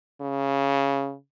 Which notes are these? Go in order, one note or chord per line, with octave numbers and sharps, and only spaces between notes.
C#3